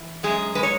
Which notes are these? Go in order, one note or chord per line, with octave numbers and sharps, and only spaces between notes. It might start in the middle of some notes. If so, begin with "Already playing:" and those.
Already playing: E3
F#2 G#3 G#4
G#3 B4
C#5